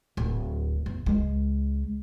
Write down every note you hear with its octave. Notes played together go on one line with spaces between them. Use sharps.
D1
E2
C#2 G#3